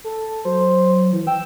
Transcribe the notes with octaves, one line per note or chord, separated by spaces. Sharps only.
A4
F#3 C5
E3
G5 E6